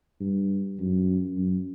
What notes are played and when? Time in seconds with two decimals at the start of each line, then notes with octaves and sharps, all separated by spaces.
0.20 G2
0.79 F#2
1.38 F#2